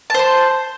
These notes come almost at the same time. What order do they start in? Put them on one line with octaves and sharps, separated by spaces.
A5 C5 C6